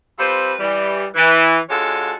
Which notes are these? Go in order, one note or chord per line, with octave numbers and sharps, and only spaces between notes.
G3 C4 F4 A4 B4 C5
E3 G3
E3
D3 G#3 C#4 F4 F#4 A4